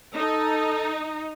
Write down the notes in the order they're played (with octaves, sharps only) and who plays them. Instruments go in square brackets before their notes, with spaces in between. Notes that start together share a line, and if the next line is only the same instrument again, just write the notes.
[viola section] D#4 [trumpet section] A4